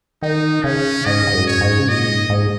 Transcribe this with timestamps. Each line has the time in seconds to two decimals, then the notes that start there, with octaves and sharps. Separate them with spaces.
0.22 D#3 D#4
0.64 C#3 C#4
1.05 G#2 D#5
1.27 G#2
1.34 F#2
1.47 C#5
1.61 G#2
1.79 C#3
1.88 A#2 D#5
2.09 G#2
2.29 G#2